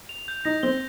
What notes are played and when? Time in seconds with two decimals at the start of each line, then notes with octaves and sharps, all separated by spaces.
0.09 F7
0.28 G6
0.45 D#4 A#6
0.63 C4 G7